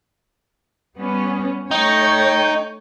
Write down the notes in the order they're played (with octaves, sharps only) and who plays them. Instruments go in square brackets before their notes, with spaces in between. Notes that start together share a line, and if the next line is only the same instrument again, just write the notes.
[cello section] G3 B3 C#4
[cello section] A3 C#5 [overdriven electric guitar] D#4 [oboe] G5